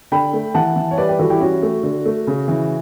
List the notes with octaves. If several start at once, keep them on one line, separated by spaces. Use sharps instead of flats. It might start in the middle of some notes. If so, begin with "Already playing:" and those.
D3 G5 B5
A3
E3 F#5 A5
E3
C#5
G3 B4 D5
G4 B4
E3 F#4 A4
E4 G4
C#4 F#4
A3
D3
A3
C#3
E3